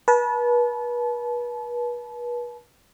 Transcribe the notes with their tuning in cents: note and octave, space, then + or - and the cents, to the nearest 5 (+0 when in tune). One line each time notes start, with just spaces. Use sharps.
B4 -35 A5 -30